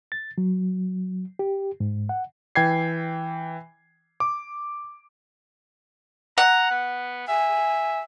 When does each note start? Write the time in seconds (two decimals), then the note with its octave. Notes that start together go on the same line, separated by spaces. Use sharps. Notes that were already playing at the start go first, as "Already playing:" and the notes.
0.12 A6
0.38 F#3
1.39 G4
1.80 G#2
2.09 F#5
2.56 E3 G5 G#6 C7
4.20 D6
6.38 F#5 A#5
6.71 B3
7.28 E5 G#5